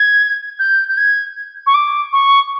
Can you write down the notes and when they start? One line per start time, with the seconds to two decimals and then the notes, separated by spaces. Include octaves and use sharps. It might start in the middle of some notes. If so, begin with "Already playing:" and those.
Already playing: G#6
0.59 G6
0.89 G6
0.97 G#6
1.66 C#6
1.74 D6
2.13 C#6